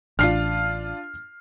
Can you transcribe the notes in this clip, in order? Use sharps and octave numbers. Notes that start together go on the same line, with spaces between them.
A1 D4 F4 F6 C7